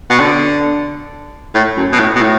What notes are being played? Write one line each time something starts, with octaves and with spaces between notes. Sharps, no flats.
B2
D3
A2
F#2
B2
A2
B2
A2